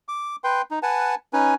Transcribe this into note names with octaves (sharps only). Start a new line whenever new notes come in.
D6
B4 G5 C6
D#4
B4 F#5 G#5 A5
C#4 D#4 B4 G#5